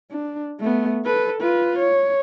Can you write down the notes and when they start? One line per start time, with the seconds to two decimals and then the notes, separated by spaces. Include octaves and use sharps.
0.11 D4
0.60 A3 B3
1.05 A4 B4
1.42 F4 B4
1.79 C#5